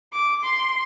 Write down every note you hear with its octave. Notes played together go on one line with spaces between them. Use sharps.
D6
C6